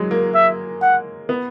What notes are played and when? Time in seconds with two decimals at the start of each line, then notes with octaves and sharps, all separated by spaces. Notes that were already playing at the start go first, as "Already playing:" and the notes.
Already playing: F#3 G#3
0.11 A#3
0.34 E5
0.82 F#5
1.29 B3